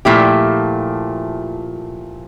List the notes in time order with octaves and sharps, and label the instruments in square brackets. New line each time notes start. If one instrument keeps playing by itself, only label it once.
[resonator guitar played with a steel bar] A#2 F3 A3 E4 G4